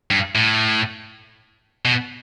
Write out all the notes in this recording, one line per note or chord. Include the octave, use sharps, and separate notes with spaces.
G2
A2
B2